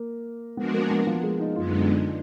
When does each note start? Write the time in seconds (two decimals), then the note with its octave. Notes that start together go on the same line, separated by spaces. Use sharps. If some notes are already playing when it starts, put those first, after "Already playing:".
Already playing: A#3
0.57 F3 G#3 B3 D4 F#4 A#4
0.73 A#3
0.91 B3
1.07 F3
1.23 G#3
1.39 D#4
1.56 F#2 D3 G#3 B3 F4
1.68 D#4
1.81 D#4
1.93 D4